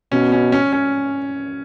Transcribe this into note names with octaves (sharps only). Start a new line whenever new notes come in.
B2 C#4
C#4
C#4
C#4